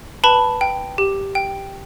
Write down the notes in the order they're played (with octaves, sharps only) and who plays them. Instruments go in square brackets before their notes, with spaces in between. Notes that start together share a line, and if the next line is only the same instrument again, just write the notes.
[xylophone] B4 A5 B5
G5
G4
G5